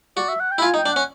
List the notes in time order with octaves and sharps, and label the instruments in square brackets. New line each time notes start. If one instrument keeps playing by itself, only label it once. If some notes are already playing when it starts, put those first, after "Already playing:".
[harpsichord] F#4 [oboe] D5
[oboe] E5
F#5
G5
[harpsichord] E4
[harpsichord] F4 [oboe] G#5
[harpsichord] D#4
[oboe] G5
[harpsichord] D4
[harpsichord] C#4 [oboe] F#5